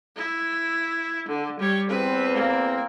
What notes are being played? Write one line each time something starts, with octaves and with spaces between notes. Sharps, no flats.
E4
D3
G3 C#5
E2 C4 B4
A#3